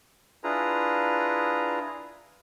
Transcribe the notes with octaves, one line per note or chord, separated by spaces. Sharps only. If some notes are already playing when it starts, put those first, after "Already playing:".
D4 E4 F4 G#4 B4 A#5